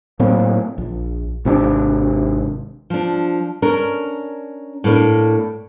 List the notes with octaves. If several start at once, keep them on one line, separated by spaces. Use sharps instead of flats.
A2 F#3 A#3 C4
A#1
G#1 C3 C4 D4
F3 D4
C#4 D4 A#4
A2 A#3 D4